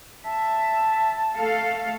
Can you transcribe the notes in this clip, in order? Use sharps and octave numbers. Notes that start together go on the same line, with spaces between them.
E5 A5
A3 A4 F5